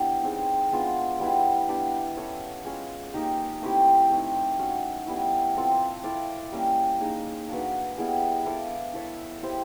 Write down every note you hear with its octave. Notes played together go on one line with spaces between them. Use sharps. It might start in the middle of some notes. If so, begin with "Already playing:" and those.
Already playing: B3 D4 E4 G4
C4 D#4 G#4 C#5
G#3 B3 D4 F4
G3 B3 E4
B3 D4 G4
C#4 E4 A4 C#5
G#3 C#4 F4 G#4
A#3 D#4 G4
A3 C4 E4 G4
A3 C4 D#4
C#4 F#4 A4
G3 B3 E4
C4 F4 A4
E4 A4 D5 F5
G3 A#3 C#4
A#3 D#4 G#4 C#5
A#3 D4 F#4 B4
G3 B3 E4 G#4
E4 A4 D5 F5
E4 A4 C#5 E5
E4 G4 C5 E5